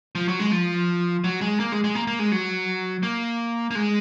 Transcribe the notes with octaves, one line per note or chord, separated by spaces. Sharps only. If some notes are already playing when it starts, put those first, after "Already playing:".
F3
F#3
G#3
F3
F#3
G#3
A#3
G#3
G#3
A#3
A#3
G#3
F#3
A#3
A#3
G#3